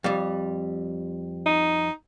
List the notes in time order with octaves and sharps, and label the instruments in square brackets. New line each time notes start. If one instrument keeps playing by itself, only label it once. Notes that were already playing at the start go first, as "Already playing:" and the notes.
[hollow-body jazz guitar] F2 G3
[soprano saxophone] D#4